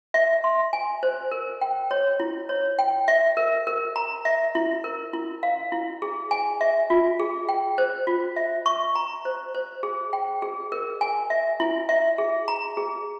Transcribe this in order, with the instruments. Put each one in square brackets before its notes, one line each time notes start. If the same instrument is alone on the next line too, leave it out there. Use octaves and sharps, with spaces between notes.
[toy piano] E5
C6
G#5
C5
A#4
G5
C#5
E4
C#5
G5
E5
A#4
A#4
A#5
E5
E4
A#4
E4
F5
E4
G#4
G#5
E5
F4
G#4
G5
C5
F4
E5
C#6
A#5
C5
C5
G#4
G5
G#4
A#4
G#5
E5
E4
E5
G#4
A#5
G#4